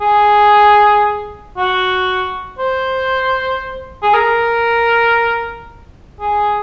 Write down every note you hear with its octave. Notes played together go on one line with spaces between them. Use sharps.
G#4
F#4
C5
G#4
A#4
G#4